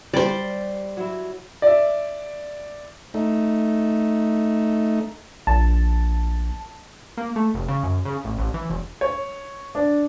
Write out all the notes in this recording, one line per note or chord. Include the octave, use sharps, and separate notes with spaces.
G3 C5 D5
F#3 E4
D5 E5
A3 D#4
A#1 A5
A#3
A3
F1
C#3
F#2
C#3
A1
A1
E3
E1
C#5
D4